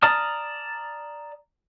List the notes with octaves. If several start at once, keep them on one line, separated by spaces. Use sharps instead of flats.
D5 A5 A#5 D#6 F6